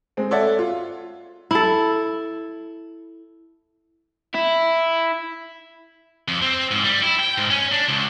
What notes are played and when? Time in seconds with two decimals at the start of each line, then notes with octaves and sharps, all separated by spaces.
0.17 G#3 C4
0.31 A4 C#5 D5 E5 F#5
0.59 F4
1.51 E4 A4
4.34 E4
6.28 F2
6.42 C4
6.71 G#2
6.84 G3
7.03 E4
7.20 G5
7.38 G#2
7.50 C#4
7.72 D4
7.88 C#2